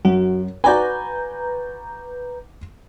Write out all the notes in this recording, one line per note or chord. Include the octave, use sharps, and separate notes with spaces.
F#2 F#4
F#4 B4 D5 G#5 A#5 G6